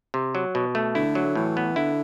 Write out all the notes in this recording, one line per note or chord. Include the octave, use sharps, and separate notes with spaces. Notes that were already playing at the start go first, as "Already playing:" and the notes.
C3
F#3
B2
A3
D3 E4
F#3
A2 E3
B3
D3 E4